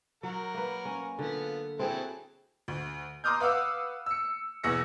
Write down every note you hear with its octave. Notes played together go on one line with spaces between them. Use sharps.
F#3 A#4 F#5
A#3 B4
C#4
D3 B3 F4
F#3 C4 E4 G#4 A4 C5
D2
A#5 C6 D6 D#6 F6 G6
B4 F5 F#5 D6 E6
E6 C#7
E2 B2 G#4 E6 A#6 C#7